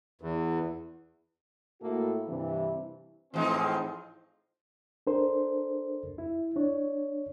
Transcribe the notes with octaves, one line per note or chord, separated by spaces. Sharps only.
E2
A2 A#3 E4 F#4 A4
G2 C3 E3
A2 E3 F3 G#3 C4 D#4
D4 A4 A#4 C5
E4
D4 C#5